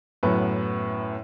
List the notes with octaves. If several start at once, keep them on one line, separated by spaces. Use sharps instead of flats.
F#2 A2 B3 B4